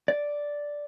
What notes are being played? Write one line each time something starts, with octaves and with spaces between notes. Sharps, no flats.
D5